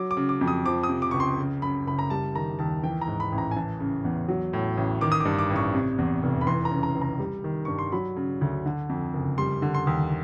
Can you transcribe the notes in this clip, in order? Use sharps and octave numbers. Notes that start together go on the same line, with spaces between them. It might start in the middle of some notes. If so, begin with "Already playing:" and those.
Already playing: F#3 D6
D6
C#3
D6
F2
D#6
F3 D6
D#6
C3
D6
C#2 C#6
C6
C#3
F#2 B5
F#1 B5
A#5
G3 A5
D#3 A#5
D#2 A5
E3 G5
A#5
G#2
B5
A1
A#5
G#5
E3 A5
C#3
E2
F#3
A2
A1
D#3 D6
D#6
G2 D6
D6
A1
C#6
C3
E2
F1
B5
E3 C6
A#5
C#3
A#5
C#2
A#5
G3
D#3
G2 C#6
C6
F#3 B5
C#3
D2
D3
F2
F#1
G3 C6
D3
C6
D#2